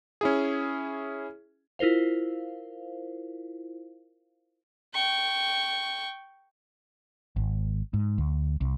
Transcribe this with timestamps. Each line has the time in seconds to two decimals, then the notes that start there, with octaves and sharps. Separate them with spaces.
0.21 C#4 E4 G#4
1.79 E4 F4 A#4 C5 F5
4.94 G5 C#6
7.36 G#1
7.94 G#2
8.18 D2
8.61 C2